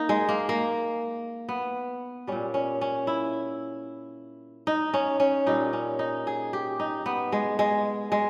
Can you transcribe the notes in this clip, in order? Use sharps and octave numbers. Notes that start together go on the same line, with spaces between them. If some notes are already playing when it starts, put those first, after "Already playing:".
Already playing: A#3 D#4
G#3
A#3
A#3
B3
A#2 G3 C#4
C#4
C#4
E4
D#4
C#4
C#4
A#2 G3 D#4
C#4
D#4
G#4
G4
D#4
B3
G#3
G#3
G#3